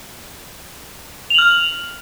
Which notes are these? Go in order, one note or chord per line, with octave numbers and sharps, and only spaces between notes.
F6 F7 F#7